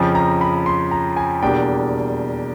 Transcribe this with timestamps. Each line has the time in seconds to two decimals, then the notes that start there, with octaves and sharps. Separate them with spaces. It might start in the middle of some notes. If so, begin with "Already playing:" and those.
Already playing: F2 C#3 F3
0.15 A#5
0.41 B5
0.66 C6
0.91 A#5
1.17 G#5
1.42 E2 B2 G3 A#3 D4 G5